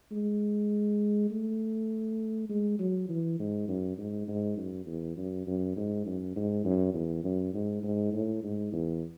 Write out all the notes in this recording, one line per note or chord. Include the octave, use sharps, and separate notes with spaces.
G#3
A3
G#3
F#3
E3
G#2
F#2
G#2
G#2
F#2
E2
F#2
F#2
G#2
F#2
G#2
F#2
E2
F#2
G#2
G#2
A2
G#2
E2